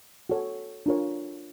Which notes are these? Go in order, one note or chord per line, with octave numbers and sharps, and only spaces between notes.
F#4 A4 C#5
D4 F4 A#4 C#5